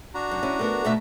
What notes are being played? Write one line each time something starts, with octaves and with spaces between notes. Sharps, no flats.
D4 F#4 A#5
F#2
C#4 E4
A3 B3 A#4
B2 A3 E5